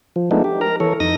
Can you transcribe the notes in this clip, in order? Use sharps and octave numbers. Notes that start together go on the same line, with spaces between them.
F3
F3 G#3 A3 B3 D4 D#4
G4
A#4 A#5
E3 A4 C#5
F2 D#4 D#6 A#6